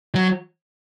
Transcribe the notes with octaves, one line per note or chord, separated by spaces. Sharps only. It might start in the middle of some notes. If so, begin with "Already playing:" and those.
F#3